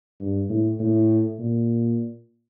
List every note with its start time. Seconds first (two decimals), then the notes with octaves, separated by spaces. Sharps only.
0.20 G2
0.49 A2
0.80 A2
1.39 A#2